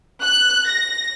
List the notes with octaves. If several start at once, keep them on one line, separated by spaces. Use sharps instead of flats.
F#6
A#6